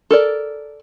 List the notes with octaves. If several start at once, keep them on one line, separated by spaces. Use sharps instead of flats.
A4 A#4 D5